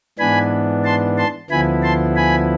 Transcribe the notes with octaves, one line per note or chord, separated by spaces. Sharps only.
G#2 E3 B3 D4 G#5 B5
A5 C6
A5 C6
D2 D3 F3 B3 E4 G#5 B5
A5 C6
G#5 B5